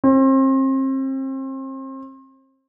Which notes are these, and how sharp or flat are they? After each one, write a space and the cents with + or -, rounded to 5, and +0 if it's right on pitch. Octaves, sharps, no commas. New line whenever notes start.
C4 +35